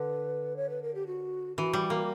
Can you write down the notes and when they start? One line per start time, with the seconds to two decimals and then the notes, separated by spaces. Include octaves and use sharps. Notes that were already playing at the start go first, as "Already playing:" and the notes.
Already playing: D3 B4
0.56 C#5
0.70 B4
0.83 A#4
0.95 G4
1.07 F#4
1.57 E3 F#4
1.73 G3
1.90 A#3